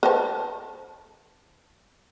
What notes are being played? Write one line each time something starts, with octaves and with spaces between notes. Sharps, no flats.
B4 C5 A5